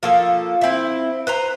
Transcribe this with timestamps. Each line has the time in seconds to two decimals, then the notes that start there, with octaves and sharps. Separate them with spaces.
0.03 F3 A#3 A4
0.61 C4 E4
1.27 B4 C5 A#5